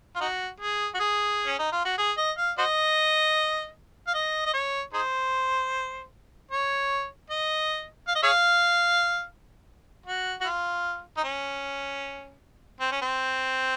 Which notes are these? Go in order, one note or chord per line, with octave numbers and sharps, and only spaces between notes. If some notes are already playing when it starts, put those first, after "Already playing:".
F4
D#4 F#4
G#4
F#4
G#4
C#4
D#4
F4
F#4
G#4
D#5
F5
F#4 C5 D#5
F5
D#5
D#5
C#5
D#4 G#4 C5
C#5
D#5
F5
D#5
G#4 C#5 F5
F#4
F#4
F4
D#4
C#4
C4
C#4
C4